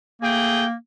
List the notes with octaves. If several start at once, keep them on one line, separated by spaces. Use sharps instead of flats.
A3 A#3 G#4 G5